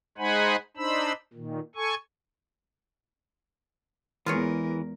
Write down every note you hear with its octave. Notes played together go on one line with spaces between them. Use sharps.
G#3 D#4 C5 F#5 G#5 B5
D4 D#4 C5 B5 E6
A#2 D#3
A4 G#5 C#6
E2 E3 G#3 F4 G#4 A#4 C#5